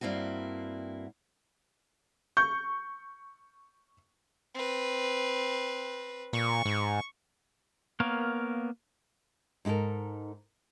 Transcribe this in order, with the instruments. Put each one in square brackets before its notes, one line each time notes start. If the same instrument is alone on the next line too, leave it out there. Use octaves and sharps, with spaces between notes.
[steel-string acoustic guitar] G2 A#3 C4 E4 F#4
[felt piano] C#6 G6
[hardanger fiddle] C4 B4
[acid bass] A#2 [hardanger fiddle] C#6
[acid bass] G#2
[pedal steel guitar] A#3 B3 A#4 C#5 F5
[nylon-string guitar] G#2 D#4 G4 A4 A#4